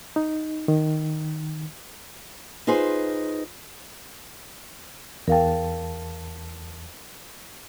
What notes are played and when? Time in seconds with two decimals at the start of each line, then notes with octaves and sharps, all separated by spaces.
0.16 D#4
0.68 D#3
2.67 D#4 F4 G#4 B4 C5
5.28 E2 A#4 F5 G5 A5